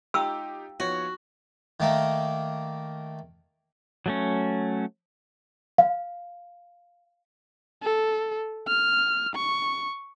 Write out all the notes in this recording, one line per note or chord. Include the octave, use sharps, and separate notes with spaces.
D#4 F4 G4 F5 G5 A#5 E6
F3 B3 F#4 C#5
D#3 A3 A#3
F#3 A3 C#4
F5
A4
F6
C#6